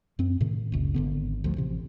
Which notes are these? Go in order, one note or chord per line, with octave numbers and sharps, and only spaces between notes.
F#2 C4
A2 C3 D#3
F#1 C#2
G#1 D3 B3
D2 F3
A1 C3